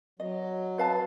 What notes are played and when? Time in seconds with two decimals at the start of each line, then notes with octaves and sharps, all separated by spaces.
0.20 F#3 D#5
0.78 B4 F5 A5